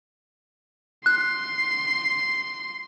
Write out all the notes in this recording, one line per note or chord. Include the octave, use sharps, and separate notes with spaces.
C6 F#6